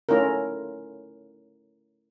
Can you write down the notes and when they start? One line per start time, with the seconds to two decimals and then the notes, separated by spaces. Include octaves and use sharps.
0.09 A3 C#4 E4 F4 A#4